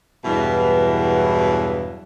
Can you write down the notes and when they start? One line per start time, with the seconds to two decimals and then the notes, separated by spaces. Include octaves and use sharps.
0.25 E2 G2 B2 E3 F#3